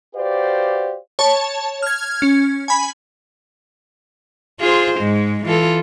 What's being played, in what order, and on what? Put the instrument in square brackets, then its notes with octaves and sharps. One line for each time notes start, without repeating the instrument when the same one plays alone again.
[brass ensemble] F#4 G4 B4 C5 D5 F5
[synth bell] C#5 A5
F6 G#6
C#4
G#5 B5
[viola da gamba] F4 G#4 C5
G#2 G#3
E3 F4 A4